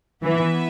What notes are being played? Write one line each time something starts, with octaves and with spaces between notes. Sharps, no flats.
E3 B3 E4 B4 E5